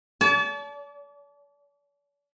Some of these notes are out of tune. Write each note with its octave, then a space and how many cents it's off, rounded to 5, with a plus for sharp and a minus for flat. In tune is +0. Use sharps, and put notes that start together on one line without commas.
D5 -45 A5 -30